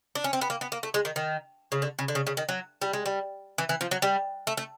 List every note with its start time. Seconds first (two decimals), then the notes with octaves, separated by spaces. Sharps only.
0.15 D4
0.24 C#4
0.33 C4
0.41 B3
0.50 A#3
0.61 B3
0.72 A#3
0.83 A3
0.94 G#3
1.05 D#3
1.16 D#3
1.72 C#3
1.82 D3
1.99 C#3
2.08 D3
2.15 C#3
2.27 C#3
2.37 D#3
2.49 F#3
2.82 G3
2.93 G#3
3.06 G3
3.58 E3
3.69 E3
3.81 F3
3.91 F#3
4.02 G3
4.47 A3
4.57 A3